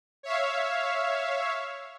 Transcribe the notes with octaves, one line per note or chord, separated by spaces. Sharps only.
C#5 E5 F5